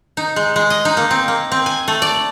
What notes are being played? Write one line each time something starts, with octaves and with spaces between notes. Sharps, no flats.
D#4
G#3
G#3
D#5
D#4
A#3
C4
A#3
C4
G#5
A3
D5